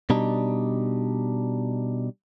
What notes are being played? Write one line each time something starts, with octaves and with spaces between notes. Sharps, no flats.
B2 G3 D4 D#4